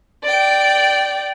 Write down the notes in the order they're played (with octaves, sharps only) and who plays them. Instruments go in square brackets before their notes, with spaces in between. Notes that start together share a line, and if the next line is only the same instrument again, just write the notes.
[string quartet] D5 G5